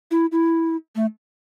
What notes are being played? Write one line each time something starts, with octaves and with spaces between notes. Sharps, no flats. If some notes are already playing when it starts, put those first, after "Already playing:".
E4
E4
A3